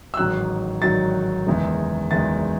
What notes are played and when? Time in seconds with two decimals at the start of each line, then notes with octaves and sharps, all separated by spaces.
0.14 E6
0.17 A1 G#2 D#3 F#3 F#6
0.82 A1 G#2 D#3 F#3 A6
1.47 F#1 E2 D#3 G#3
2.11 F#1 E2 D#3 G#3 A6